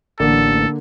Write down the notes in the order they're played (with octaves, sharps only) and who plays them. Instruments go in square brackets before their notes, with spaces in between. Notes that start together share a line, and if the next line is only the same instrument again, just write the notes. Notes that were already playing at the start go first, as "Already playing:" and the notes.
[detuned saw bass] A1 [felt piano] D3 A#3 [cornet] A4